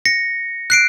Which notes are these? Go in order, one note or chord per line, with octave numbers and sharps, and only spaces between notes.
A#6 C#7
F#6 C7 D7